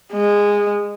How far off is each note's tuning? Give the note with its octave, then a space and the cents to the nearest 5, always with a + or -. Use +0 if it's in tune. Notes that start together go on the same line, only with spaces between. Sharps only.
G#3 -15